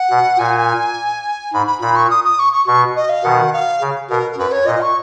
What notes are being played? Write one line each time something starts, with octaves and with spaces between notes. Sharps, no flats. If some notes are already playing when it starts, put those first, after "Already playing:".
Already playing: F#5
B2
A#2 G#5
G#2 B5
B5
A#2 B5
C#6
D#6
D#6
C#6
C#6
B2 C#6
D#5
F5
B2 D#3 F#5
F5
C#3
B2 A#4
A#4
F#2 B4
C#5
A#2 D#5
C#6